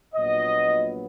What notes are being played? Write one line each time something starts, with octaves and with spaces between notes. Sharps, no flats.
A#1 A#2 F#3 B3 D#5